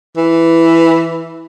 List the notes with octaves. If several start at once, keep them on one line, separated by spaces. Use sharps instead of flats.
E3